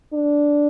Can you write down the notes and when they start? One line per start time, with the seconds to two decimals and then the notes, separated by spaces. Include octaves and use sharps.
0.13 D4